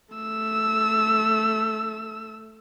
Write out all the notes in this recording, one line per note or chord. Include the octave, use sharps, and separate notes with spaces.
A3 E6